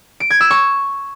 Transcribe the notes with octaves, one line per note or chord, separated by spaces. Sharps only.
D7
G#6
E6
C#6